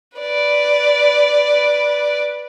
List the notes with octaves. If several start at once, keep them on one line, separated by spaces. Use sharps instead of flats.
B4 D5